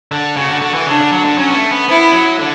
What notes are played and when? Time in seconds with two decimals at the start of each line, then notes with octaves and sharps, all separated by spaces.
0.12 D3
0.36 C#3 F#4
0.48 D3
0.62 D3
0.74 E3
0.86 C#3 D4
0.99 D3
1.12 F#3
1.25 D3
1.37 F#3 C#4
1.50 B3
1.54 A3
1.71 B3
1.88 B3 E4
2.13 F#3
2.39 D3